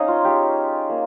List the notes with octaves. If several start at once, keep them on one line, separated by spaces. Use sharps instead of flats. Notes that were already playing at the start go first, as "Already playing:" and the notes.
Already playing: G#3 C4 C#4 D#4 C#5 D#5 F5
F4
G#3 C#4 F4 G4
A#3 F4